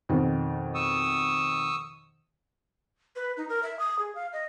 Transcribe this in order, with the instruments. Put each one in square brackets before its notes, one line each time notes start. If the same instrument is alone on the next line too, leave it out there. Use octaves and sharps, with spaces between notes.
[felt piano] F2 B2 D#3
[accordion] C#6 D#6 E6
[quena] B4
D#4
A#4
E5
D#6
G#4
F5
D#5